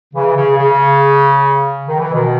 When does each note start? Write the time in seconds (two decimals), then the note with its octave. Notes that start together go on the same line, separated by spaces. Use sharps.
0.14 C#3 E3
0.35 C#3
0.56 C#3
1.86 D#3
1.99 E3
2.13 B2 D#3